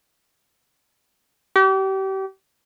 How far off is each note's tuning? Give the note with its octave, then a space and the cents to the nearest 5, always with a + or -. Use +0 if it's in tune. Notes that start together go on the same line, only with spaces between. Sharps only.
G4 -35